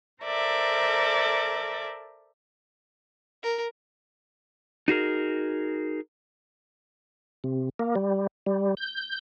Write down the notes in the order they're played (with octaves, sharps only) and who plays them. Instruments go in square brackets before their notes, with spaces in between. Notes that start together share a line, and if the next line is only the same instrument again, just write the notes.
[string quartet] A4 A#4 C5 D5 E5
[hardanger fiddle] A#4
[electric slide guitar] D#4 F#4 G#4 A#4
[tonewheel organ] C3
A#3
G3
G3
G6